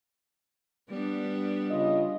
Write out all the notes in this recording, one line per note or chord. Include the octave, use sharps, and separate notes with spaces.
G3 B3 D4
C#3 F4 D#5